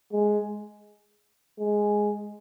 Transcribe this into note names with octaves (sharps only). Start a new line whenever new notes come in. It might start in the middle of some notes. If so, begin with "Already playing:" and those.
G#3
G#3